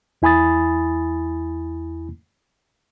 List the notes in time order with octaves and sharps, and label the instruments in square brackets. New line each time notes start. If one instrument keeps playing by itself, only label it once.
[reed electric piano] E2 E4 G#5 B5 D#6 A6